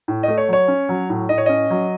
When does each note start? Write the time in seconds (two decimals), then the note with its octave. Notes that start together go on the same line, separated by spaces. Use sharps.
0.08 A2
0.23 A3 D#5
0.38 C#5
0.48 F#3 C#5
0.68 C#4
0.89 F#3
1.09 A2
1.29 A2 D#5
1.38 C#5
1.46 C#4 D#5
1.70 F#3